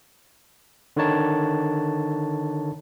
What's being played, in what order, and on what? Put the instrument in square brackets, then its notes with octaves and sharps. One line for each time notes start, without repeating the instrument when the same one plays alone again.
[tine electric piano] D3 D#3 D#4 C#5 A5